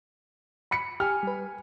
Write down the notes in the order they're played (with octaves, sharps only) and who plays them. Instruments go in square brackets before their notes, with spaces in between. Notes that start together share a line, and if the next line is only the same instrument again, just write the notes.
[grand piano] B5 B6 C#7
[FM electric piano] G4 [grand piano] G#5 F6
[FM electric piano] G3 B4